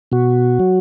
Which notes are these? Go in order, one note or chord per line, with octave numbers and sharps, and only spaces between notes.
B2 F#4
F#3